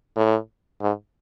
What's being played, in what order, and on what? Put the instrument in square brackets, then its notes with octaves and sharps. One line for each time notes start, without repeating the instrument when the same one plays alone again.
[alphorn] A2
G#2